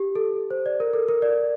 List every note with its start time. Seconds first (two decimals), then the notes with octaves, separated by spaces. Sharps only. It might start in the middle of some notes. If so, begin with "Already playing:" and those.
Already playing: G4
0.15 A4
0.51 C5
0.66 D5
0.80 A#4
0.93 A4
1.08 A#4
1.22 D5